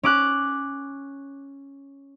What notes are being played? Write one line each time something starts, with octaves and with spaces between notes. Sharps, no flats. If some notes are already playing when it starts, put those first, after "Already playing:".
C#4 D6 F#6